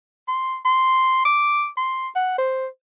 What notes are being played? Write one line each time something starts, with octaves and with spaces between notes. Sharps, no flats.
C6
C6
D6
C6
F#5
C5